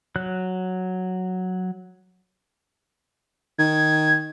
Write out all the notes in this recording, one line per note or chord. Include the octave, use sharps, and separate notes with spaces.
F#3 F#6
D#3 G#6